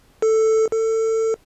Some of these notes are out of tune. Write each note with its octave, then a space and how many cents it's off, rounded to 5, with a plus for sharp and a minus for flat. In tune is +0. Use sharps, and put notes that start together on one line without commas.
A4 +5
A4 +25